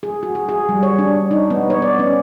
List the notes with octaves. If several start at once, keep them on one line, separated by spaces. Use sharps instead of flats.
G#4
F#4
G#4
G#4
G3
C#5
D4
D#4
B3
C#5
D5
C#4